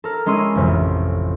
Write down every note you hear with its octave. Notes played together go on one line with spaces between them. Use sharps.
A4 A#4
G#3 C#4 E4 C6 E6 D#7
A1 F2 C3